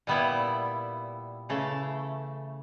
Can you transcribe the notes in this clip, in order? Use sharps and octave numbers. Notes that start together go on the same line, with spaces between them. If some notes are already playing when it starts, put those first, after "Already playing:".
A#2 G3 B3 E4
C#3 E3 A3